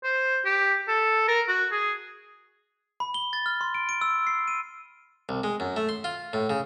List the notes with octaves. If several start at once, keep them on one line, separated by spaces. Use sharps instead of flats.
C5
G4
A4
A#4
F#4
G#4
B5
G7
A6
F6
C6
D7
D7
E6
C7
D#7
C2
G#3
F#2
A3
C6
F4
A2
C#3